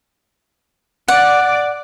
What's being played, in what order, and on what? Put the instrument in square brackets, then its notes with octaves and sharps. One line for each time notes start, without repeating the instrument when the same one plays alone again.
[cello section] D5 [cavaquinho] F#5